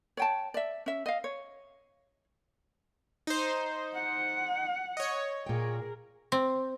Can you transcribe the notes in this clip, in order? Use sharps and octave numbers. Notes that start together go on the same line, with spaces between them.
C#5 G5 A5
D5 E5
C#4 E5
D#5 F5
C#5
D#4 C5
F#5
C#5 D#5
A#2 G#4 A#4 G5
C4